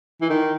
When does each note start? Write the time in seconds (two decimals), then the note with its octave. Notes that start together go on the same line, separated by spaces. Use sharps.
0.21 E3
0.29 D#3